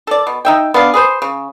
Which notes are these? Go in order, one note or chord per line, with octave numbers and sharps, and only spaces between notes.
A4 D5
B2
D#4 E5 G5
B3 D4 F5
G#4 B4 C5
C#3